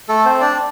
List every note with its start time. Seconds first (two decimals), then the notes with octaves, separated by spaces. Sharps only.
0.09 A3 A4
0.25 C4 C5
0.41 D4 D5